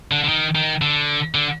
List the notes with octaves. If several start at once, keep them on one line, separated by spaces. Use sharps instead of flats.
D3
D3
D#3
D#3
D3
D3